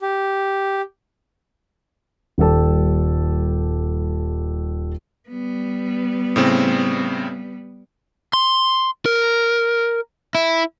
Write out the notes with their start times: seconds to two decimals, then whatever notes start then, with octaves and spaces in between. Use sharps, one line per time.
0.01 G4
2.38 D#1 G3 G4 A4 A5
5.29 G3 B3
6.36 A2 C#3 C4
8.33 C6
9.05 A#4
10.35 E4